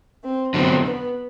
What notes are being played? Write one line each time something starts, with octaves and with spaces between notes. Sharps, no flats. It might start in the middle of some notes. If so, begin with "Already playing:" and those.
C4
D3 F#3 B3 C4
B3